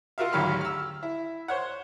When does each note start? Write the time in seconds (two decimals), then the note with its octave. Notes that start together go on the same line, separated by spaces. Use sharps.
0.18 F4 F#4 A#4 E5 F5
0.33 G#1 D2 F#3 G4 B5 F6
0.61 E6 F6
1.03 E4
1.48 C5 C#5 F#5